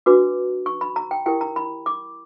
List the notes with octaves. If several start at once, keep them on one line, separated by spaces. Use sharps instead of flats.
D4 F#4 B4 D6
C#6
B5
A#5
G5
E4 G4 A#4 G5
A#5
B5
D6